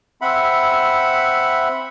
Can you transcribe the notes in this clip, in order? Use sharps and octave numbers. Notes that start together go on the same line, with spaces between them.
C4 E5 F#5 B5